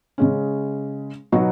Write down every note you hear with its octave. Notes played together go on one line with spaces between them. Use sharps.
C#3 G#3 C#4
B2 F#3 B3 D#4 F#4